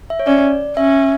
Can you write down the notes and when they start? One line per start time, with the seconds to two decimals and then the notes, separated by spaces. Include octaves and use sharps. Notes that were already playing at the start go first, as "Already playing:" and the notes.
0.10 E5
0.19 C#5
0.27 C#4 D5
0.77 C#4 E5